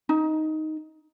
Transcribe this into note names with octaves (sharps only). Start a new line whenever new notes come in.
D#4